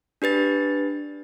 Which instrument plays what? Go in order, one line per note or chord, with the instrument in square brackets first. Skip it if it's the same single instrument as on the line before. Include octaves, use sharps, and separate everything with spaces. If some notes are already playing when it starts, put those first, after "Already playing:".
[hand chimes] D4 G4 B4 A6